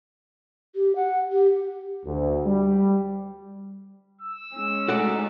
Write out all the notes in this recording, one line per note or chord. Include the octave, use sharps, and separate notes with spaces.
G4
F#5
G4
D2
G3
E6
G#3 C#4
A3 D#4 F#4 A4 D5